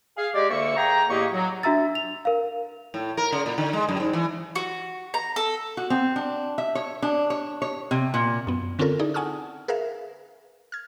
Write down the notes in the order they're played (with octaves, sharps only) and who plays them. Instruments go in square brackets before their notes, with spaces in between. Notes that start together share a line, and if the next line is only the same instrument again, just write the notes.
[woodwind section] G#4 F5
G#3 G4 D5
D2 D3 A#3 E5 C#6
A#3 G#4 G5 A#5
E2 A2 A#3 G4 D#5 C#6
F#3
[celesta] D4 F#4 E5 A#5 E6 A6
F7
A#4 F5
[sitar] A2
A#4
C#3
A#2
D3
G#3
F#2
G#2
E3
[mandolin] F#4
A#5
A4
[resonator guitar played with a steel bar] F#4
C4
D4
E5
C#5
D4
C#5
C#5
C3
A#2
[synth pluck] F#2 B3
D3 C4 C#4 F4 A4 A#4
D#4 E4 G#4 D5
F#5 G#5 A5 C#6 D#6 F6
G#4 A#4 B4 E5 F5
F6 G#6